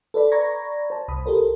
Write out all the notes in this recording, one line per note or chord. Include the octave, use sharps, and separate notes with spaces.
A4 B4 D5 B5
D5 A#5 B5 C#6 G#6 A#6
C5 A5
C2 B5 D#6
G4 A4 A#4 C5